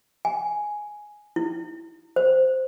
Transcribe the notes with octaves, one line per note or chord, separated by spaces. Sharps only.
G#5
E4
C5